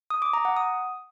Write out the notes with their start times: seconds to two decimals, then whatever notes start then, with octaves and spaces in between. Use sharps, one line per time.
0.10 D#6
0.22 D6
0.33 A#5
0.45 F#5
0.56 D#6